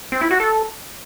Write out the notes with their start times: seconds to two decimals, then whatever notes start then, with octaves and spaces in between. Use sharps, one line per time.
0.12 C4
0.21 E4
0.31 F#4
0.40 A4